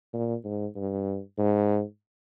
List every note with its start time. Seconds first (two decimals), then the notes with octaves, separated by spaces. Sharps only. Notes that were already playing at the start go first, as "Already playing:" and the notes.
0.13 A#2
0.44 G#2
0.76 G2
1.38 G#2